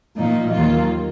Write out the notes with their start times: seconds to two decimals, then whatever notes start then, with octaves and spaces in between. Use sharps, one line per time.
0.15 A#2 F3 A#3 D#4
0.51 D#2 D#3 F#3 A#3 F4